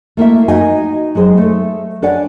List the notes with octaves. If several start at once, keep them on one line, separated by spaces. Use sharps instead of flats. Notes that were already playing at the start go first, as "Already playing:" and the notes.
A3 A#3 E4 E5
D#4 F#4 D#5 G#5
F#3 G#3 G#4 C5
A3 A4
D4 B4 C#5 D5 F#5 G#5